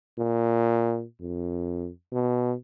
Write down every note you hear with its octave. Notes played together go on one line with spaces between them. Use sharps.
A#2
F2
B2